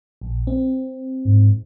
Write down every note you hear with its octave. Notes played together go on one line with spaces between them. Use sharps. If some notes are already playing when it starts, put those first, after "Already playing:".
A#1
C4
G#2